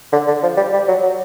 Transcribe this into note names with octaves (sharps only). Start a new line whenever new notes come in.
D3
D3
F3
G3
G3
F#3
F#3